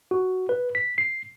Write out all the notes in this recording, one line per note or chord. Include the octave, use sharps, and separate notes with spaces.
F#4
B4
B6
C7